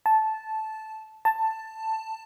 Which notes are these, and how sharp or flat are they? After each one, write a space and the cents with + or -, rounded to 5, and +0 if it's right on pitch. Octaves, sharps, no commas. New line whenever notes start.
A5 -10
A5 +10